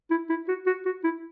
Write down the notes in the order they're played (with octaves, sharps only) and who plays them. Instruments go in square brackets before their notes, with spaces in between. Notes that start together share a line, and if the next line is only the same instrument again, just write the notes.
[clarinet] E4
E4
F#4
F#4
F#4
E4